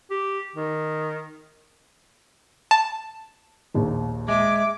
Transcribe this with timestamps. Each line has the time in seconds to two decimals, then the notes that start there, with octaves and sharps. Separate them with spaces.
0.11 G4
0.56 D#3
2.71 A5
3.74 A#1 D#2 D#3
4.28 G#3 E5 D6